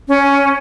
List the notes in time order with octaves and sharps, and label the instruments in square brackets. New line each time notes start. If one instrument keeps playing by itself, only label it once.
[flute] C#4